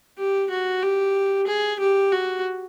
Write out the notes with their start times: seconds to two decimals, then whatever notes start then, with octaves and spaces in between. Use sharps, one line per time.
0.17 G4
0.50 F#4
0.82 G4
1.46 G#4
1.80 G4
2.12 F#4